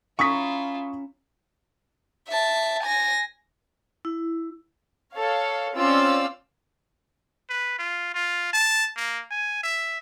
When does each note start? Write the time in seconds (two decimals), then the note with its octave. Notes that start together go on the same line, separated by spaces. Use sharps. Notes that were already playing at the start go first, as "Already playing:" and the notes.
0.19 C#4 E4 F4 A#5 C#6 D#6 B6
2.28 E5 A5
2.83 G#5 A#6
4.05 E4
5.14 A4 C#5 F5
5.76 C4 C#4 F4 D5 F5 E6
7.50 B4
7.79 F4
8.15 F4
8.53 A5
8.96 A#3
9.31 G#5
9.64 E5